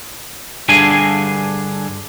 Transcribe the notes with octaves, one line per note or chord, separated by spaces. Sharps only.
G2 D3 D4 G#4 G#5